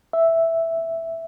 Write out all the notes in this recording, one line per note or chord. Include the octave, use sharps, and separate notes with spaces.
E5